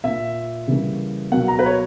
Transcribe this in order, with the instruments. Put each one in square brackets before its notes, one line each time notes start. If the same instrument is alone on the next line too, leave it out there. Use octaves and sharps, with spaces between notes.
[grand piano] A#2 A#3 E5
C#3 E3 G3 A#3
B2 F#3 A#3 F#5
A#5
B4
C#5